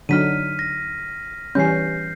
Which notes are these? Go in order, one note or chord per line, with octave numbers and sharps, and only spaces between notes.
D3 F#3 D#4 F6 B6 D#7
A#6
E3 G3 C#4 G6 C7